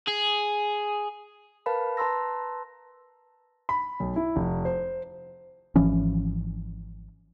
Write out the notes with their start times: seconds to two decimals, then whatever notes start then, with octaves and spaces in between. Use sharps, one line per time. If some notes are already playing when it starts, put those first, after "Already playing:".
0.08 G#4
1.66 A#4 B4 F5 A5 B5
1.97 B4 A5 A#5 C6 E6 A#6
3.69 B5
4.00 B1
4.16 E4
4.36 F1
4.65 C5
5.76 G#1 E3 F3 C#4